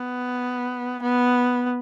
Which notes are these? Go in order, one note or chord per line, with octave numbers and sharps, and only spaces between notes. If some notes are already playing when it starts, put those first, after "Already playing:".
Already playing: B3
B3